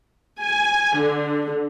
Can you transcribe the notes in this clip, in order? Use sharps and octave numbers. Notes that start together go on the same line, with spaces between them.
G#5
D3